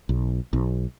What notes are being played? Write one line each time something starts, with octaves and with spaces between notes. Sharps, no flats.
B1
B1